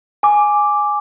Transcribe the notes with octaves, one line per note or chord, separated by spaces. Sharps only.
G#5 D6